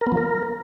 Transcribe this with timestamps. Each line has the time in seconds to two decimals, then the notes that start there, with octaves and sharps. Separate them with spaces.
0.01 A#4
0.07 B3
0.12 F3
0.17 A#4